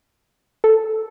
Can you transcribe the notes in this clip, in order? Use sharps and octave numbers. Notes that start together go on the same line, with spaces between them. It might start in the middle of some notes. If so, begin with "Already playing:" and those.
A4